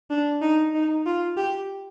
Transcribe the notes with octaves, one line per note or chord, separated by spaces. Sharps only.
D4
D#4
D#4
F4
G4